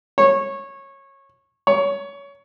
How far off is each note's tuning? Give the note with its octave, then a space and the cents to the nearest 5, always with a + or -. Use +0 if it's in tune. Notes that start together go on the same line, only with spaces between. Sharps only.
C#5 -20
C#5 +20